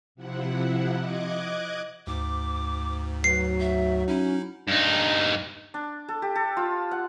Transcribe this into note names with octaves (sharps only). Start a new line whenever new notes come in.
C3 F3 E4 F#5
D#5 D6 F#6 G#6
D2 G#2 D6
F#3 B4 C7
E5
C#4 D#4 E4
G2 D#4
D4
A4
G4
A4
F4
F#5